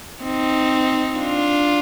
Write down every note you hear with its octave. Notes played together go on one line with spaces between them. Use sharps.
C4 D#4
D4 F4